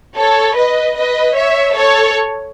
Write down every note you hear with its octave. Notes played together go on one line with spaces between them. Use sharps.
A4 C#5
B4 D#5
B4 D#5
C#5 E5
A4 C#5